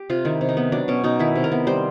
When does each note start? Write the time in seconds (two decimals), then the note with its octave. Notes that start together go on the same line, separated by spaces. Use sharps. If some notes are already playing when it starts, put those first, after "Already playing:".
Already playing: G4
0.09 C3 F4
0.25 D#3 E4
0.41 C3
0.49 D#4
0.57 B3
0.72 F#3 D4
0.88 B2 C#4
1.04 B2 D#4
1.19 D#3 E4
1.35 C3
1.44 A#4
1.52 B3
1.67 G3 C5